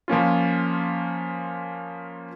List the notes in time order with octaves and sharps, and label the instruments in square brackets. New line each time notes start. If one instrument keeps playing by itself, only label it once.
[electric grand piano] F3 A#3 C#4 F4